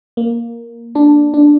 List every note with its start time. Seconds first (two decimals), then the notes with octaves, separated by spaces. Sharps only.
0.17 A#3
0.95 D4
1.34 D4